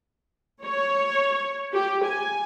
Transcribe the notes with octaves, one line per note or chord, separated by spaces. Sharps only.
C#5
G4
G#5